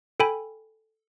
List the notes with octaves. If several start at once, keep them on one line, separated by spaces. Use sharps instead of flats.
A4 G5 G#5 B5